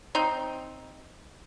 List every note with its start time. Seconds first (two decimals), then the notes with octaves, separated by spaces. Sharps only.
0.15 C4 D#4